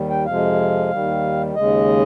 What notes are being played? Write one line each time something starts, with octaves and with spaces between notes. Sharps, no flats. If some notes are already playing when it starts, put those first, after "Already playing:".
Already playing: D#2 D#3 G3
G5
F2 C3 F3 G#3 F5
D#2 D#3 G3
D#2 C#3 G#3 D#5